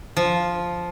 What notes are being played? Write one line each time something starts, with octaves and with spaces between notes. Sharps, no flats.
F3